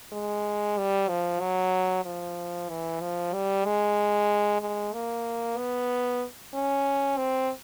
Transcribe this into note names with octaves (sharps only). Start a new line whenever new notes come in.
G#3
G3
F3
F#3
F3
E3
F3
G3
G#3
G#3
A#3
B3
C#4
C4